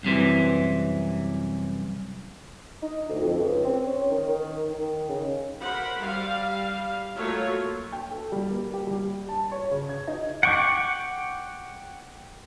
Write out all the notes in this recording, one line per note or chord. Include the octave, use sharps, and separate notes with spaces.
C2 F#2 C3 E3
D#4
D2
F2
C#2
C4
C#4
D#3
D#3
D#3
C#3
A#4 C5 F#5 B5
G3 F5
F#3 A3 A#3 F4 C#5
G5
A4
G3
A#3
G4
G3
A5
C#5
C#3
G#6
D#4
F#5 G5 C#6 D6